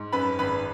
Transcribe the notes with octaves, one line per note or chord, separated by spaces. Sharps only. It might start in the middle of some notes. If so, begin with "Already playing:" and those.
Already playing: G#2
F#2 B4 B5
G#1 B4 B5